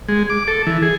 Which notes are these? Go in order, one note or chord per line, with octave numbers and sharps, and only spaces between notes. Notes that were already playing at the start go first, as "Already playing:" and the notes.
G#3
D6
A4
E3
G#4